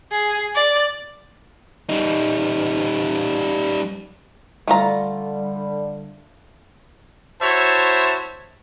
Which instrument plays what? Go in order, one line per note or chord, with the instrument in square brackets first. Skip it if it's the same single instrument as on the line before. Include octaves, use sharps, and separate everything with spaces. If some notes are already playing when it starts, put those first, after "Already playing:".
[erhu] G#4
D5
[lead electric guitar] G3 D#4
[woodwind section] D3 G3 [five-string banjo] A3 F4 A#5
[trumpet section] E4 F#4 C5 C#5 E5 A5